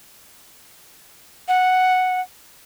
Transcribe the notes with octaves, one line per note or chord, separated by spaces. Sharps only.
F#5